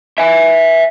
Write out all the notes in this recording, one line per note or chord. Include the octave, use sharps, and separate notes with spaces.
E5 G#5